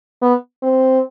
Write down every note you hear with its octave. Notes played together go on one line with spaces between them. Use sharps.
B3
C4